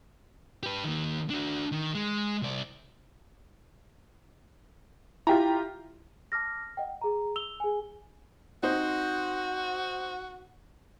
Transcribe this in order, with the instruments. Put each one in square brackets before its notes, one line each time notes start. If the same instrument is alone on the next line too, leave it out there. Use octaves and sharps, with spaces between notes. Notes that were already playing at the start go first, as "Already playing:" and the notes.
[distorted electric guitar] G4 B4
D#3 A#3
D4 F#4
D#3
G#3
C2 D5
[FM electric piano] E4 [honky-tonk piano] F4 G4 A#5
[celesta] A5 D6 F6 A#6
D#5 F#5 G5
G#4 A#5
E6 F7 G7
G#4 G#5
[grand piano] C4 D#4 C5 [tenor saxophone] F#4